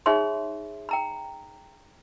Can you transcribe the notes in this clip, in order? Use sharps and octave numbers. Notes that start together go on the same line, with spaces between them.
D#4 G#4 C#5 E5 B5 C6
G5 A#5 B5